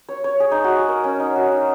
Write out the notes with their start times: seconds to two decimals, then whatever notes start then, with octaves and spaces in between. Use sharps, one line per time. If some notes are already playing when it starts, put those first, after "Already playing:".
0.09 C#5
0.24 C#5
0.40 G#4
0.52 D#4
0.64 F#4
0.76 G#4
0.88 A#4
1.04 C#4
1.20 D#4
1.36 F#4
1.52 D#4